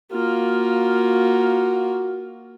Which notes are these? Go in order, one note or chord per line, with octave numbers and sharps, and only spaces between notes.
A#3 F4 F#4